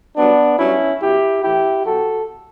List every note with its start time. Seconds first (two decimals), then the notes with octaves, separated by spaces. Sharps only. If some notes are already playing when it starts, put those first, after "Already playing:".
0.17 G2 F#3 B3 D4
0.59 G2 F#3 C#4 E4
1.02 B2 F#3 E4 G4
1.43 A2 E3 E4 G4
1.85 B2 F#3 F#4 A4